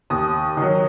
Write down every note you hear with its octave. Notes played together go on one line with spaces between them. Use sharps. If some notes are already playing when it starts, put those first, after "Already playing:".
D#2 D#6
D#3 F#3